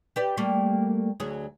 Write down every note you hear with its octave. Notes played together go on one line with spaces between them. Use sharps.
G4 B4 D5
G3 A3 A#3
D2 F#3 G#4